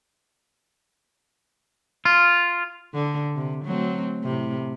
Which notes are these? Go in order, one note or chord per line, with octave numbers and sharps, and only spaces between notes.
F4
D3
C3
F#3 A3 C4
A2 C3